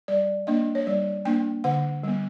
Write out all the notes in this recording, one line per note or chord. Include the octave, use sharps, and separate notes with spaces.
G3 D5
A#3 D4 D#5
C#5
G3 D5
A#3 D4 G5
D3 F#5
G3 B3